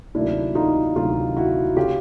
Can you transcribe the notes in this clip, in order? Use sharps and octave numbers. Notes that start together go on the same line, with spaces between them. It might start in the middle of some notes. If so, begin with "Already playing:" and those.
D2 C3 D#3 F#3 A#3 D4 E4
D#4 F4
D2 C3 D#3 F#3 A#3 D#4 F4
E4 F#4
C#3 F4 G4